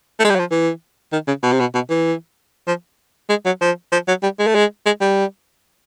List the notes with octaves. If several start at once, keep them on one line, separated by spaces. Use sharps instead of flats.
A3
G#3
G3
F#3
F3
E3
D#3
C#3
B2
C3
B2
B2
E3
F3
G#3
F#3
F3
F3
F#3
G3
G#3
A3
G#3
G#3
G3